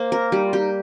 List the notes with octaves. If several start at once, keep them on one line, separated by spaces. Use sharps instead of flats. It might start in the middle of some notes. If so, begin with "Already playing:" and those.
Already playing: A#3 C5
A#4
G3 D#4
F4
D#4 G4